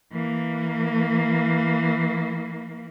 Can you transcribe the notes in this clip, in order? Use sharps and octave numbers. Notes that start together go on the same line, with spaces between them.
E3 A#3